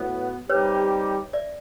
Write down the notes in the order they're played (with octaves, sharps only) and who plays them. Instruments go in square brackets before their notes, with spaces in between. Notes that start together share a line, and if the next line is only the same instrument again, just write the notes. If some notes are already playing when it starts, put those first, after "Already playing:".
Already playing: [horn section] A2 F#3 B3
[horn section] G3 C4 D#4 G4 [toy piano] B4 C#5
[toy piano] D5 E5